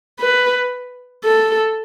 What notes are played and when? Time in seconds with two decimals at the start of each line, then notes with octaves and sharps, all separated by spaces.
0.19 B4
1.25 A4